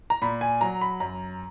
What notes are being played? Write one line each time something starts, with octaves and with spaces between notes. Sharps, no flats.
A#5
A#2 B5
G#5
F#3 A#5
B5
F#2 A#5